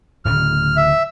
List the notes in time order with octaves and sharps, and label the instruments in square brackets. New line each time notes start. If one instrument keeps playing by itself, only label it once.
[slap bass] D1 A2 C#3 [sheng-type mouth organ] F6
[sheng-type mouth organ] E5